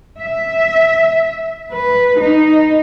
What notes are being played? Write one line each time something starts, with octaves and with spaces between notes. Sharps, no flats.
E5
B4
D#4